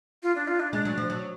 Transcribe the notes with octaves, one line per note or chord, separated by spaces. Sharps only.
F4
D4
F4
D4
G#3 D4
F#3
F3
F#3